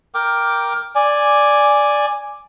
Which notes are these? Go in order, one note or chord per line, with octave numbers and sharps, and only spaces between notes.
A#4 G5 D6
D5 G#5